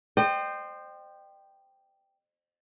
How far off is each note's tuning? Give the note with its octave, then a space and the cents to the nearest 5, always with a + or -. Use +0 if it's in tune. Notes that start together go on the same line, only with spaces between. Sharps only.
C5 +0 D#5 -40 G5 +0